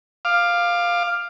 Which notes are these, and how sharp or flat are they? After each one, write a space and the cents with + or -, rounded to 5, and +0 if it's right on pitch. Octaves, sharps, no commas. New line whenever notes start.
F5 +0 D6 +25